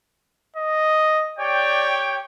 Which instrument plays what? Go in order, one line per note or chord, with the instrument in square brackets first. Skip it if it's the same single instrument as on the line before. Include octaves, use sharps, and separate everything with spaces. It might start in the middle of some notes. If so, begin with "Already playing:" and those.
[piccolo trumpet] D#5
[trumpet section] G4 C#5 G5 [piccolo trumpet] D5